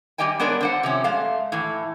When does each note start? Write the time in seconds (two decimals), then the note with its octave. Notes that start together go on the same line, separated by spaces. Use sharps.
0.18 G3 B3 G4 D#5 G5 G#5
0.40 G#3 B3 D4 A#4 C#5 D5
0.61 D3 C5 F#5
0.83 C3 F3 C#4
1.04 G#3 A3 F5
1.52 A2 E3